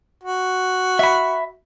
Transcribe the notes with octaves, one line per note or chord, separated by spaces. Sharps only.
F#4
E5 B5